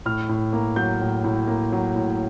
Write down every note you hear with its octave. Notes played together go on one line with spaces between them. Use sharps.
A2 F6
A2
A#3
F#3 G6
A2
A2
A#3
F#3
A2